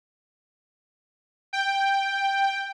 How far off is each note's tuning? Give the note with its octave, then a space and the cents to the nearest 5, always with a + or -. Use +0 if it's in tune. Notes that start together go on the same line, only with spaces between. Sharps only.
G5 +5